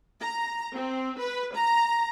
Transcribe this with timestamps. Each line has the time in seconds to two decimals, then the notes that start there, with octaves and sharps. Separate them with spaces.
0.21 A#5
0.74 C4
1.19 B4
1.54 A#5